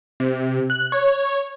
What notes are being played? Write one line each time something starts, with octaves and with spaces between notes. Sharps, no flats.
C3
F#6
C#5